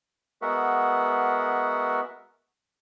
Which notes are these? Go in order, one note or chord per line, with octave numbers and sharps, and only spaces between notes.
G#3 B3 F#4 A#4 E5 F#5